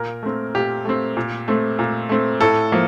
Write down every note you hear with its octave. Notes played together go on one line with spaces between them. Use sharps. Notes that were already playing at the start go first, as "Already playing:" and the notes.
Already playing: A#2 A#4
A3 C4
A#2 G4
A3 C4
A#2
A3 C4
A#2
A3 C4
A2 A4
F3 A#3